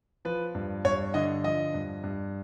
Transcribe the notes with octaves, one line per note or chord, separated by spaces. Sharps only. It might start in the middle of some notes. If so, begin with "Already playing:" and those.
F3 B4
G2
G2 C#5
D3 D#5
F3 D#5
G2
G2